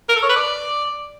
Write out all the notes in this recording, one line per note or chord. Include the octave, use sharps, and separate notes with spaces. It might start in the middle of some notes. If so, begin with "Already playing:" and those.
A#4
A4
C#5
B4
D5